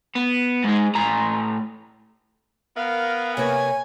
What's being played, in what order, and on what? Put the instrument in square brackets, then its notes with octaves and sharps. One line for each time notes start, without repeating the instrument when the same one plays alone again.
[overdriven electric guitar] B3
G#2 G#3
A2 A#5
[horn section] B3 A#4 [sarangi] F5
[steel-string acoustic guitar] C3 A#3 B4 [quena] C#5 [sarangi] G#5